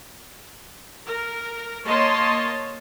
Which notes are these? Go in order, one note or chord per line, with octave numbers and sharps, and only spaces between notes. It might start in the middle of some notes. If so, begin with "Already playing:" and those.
A#4
A#3 C#5 D#5 A5 C6